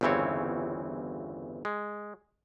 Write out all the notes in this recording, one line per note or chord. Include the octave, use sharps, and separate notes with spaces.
G1 E2 C#3 E3 C4 C#5
G#3